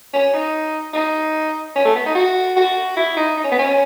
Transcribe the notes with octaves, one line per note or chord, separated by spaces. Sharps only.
C#4
D#4
D#4
C#4
A3
B3
D#4
F#4
F#4
E4
D#4
D#4
C#4
B3
C#4